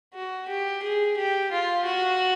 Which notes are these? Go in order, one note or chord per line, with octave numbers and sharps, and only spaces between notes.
F#4
G4
G#4
G4
F4
F#4